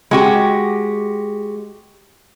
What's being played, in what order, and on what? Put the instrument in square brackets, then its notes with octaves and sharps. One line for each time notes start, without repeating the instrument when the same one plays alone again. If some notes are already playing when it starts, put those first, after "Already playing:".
[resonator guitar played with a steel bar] G#3 F#4 G4